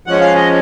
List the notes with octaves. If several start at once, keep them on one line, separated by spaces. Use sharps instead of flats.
F3 G#3 C#4 F#5
F5
D#5